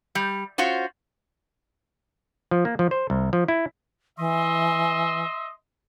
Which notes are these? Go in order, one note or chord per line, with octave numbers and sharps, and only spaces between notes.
G3
C#4 F4 F#4 C5
F3
A#3
F3
C5
C2
F3
E4
E3 D#5 E5 C6